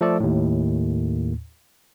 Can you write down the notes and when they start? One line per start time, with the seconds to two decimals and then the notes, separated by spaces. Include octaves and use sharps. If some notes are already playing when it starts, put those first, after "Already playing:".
0.01 F3 A3 A4 D5
0.20 D#2 A2